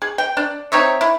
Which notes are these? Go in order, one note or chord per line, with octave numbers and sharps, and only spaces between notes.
G#4
G5
D4
C4 D#4 C#5 E5
E4